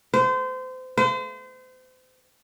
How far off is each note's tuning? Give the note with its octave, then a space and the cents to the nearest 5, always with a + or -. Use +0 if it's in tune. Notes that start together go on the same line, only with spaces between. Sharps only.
C5 -30
C5 -35